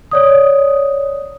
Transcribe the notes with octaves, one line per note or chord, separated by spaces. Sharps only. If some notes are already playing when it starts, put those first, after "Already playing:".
C#5 D5 D#6